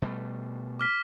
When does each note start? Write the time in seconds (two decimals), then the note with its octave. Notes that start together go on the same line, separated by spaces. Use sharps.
0.02 B2 G3 A3
0.79 D6 F6 B6